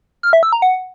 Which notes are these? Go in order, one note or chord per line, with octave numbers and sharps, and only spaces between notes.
F6
E5
E6
A#5
F#5